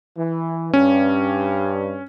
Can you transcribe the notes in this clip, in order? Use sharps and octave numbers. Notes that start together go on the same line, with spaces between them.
E3
G2 C#4